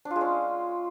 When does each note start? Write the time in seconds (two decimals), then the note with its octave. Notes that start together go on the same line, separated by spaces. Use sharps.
0.05 D4
0.10 F4
0.16 G#3
0.21 C#4